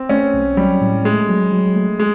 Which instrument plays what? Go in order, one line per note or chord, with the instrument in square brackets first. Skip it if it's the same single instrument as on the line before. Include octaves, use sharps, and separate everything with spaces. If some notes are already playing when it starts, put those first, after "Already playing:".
Already playing: [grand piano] C4
[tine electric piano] A3 [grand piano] C#4
[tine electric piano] B1
[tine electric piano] F#3 [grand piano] G3
[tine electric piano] A2
[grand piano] G#3 [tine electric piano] A3
[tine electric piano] F#3
F#3
A3
[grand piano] G#3